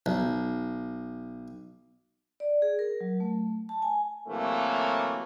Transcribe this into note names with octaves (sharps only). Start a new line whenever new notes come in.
B1
D5
G#4
A#4
F#3
A3
A5
G#5
C3 E3 F#3 A3 A#3